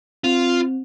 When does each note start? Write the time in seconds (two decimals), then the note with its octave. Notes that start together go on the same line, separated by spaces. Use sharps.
0.24 C4 F4